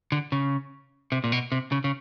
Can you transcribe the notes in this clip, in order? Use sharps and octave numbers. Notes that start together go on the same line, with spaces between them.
D3
C#3
C3
A#2
B2
C3
C#3
C#3